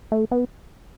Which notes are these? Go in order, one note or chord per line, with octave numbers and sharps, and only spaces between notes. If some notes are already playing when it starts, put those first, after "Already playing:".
A3
B3